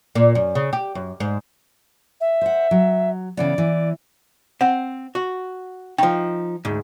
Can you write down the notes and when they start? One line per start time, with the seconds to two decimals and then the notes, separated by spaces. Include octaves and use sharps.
0.15 A#2
0.35 F#2
0.55 C#3
0.73 G4
0.95 F#2
1.20 G#2
2.21 E5
2.41 C5 F#5
2.71 F#3
3.37 C#3 E3 B3 D5
3.58 E3
4.61 C4 F#5
5.15 F#4
5.98 F3 D#4 G5
6.65 D2 G#2